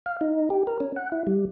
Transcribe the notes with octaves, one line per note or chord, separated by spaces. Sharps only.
F5
D#4
G4
A#4
C#4
F#5
E4
G3